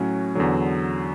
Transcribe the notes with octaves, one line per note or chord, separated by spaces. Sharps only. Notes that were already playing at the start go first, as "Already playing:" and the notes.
Already playing: A2 F#3 C#4
E2 D3 F#3